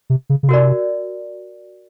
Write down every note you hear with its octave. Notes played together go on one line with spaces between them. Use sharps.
C3
C#3
C#3
C3 F#4 A#4 D5